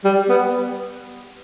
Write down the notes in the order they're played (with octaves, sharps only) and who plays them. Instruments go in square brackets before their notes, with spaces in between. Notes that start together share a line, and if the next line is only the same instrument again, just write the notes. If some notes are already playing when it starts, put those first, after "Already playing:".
[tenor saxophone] G3
B3